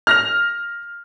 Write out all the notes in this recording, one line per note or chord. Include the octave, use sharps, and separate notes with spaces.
F6 A#6 F7